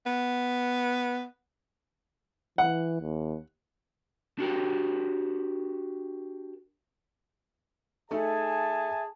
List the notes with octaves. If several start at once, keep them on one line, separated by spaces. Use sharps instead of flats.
B3
E3 F#5
D#2
D4 F#4 G4 A#4
A3 D#4 G#4 A4 E5 G#5 A5